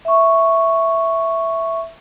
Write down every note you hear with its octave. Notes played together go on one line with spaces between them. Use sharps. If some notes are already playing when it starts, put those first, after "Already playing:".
E5 C#6